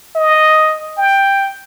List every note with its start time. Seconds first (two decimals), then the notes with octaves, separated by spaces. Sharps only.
0.16 D#5
0.98 G5